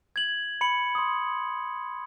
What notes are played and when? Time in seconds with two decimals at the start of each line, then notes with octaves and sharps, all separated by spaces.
0.16 G#6 F#7
0.61 B5 C#7 F#7
0.95 C6 D#6